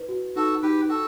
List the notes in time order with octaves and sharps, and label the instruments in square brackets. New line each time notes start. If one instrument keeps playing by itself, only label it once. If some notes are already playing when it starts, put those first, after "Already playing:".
Already playing: [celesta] E4 B4
F#4
[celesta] D#4 [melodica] F#4 A4
[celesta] D#4 [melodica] G4 B4
[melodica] F#4 A4 [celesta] G5